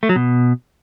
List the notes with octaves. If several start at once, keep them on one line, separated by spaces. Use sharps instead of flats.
A3
F#3
B2